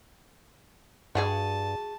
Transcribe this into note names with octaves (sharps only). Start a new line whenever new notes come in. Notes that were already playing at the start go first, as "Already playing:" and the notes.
G2 F#4 G#4 G#5 A5